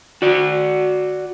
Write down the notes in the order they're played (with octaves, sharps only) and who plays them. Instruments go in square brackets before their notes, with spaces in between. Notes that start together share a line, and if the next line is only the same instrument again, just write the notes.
[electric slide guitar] F#4 D5